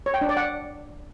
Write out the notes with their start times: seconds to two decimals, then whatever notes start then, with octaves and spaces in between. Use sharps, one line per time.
0.06 C#5
0.14 G5
0.21 D4
0.29 D5
0.37 F#5